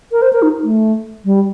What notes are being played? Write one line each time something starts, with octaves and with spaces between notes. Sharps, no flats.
A#4
C5
A#4
D#4
A3
G3